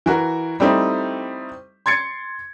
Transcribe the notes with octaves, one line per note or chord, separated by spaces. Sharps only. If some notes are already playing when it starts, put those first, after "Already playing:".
E3 F#4 A#4
G3 A3 C4 D#4 E4
C6 G#6 A6 C#7